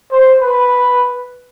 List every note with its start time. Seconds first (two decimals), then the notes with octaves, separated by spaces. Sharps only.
0.11 C5
0.41 B4